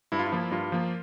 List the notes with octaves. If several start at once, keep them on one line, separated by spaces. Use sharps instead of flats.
G2 E4
F4
E4
F3 A#3
G2 F4
F3 A#3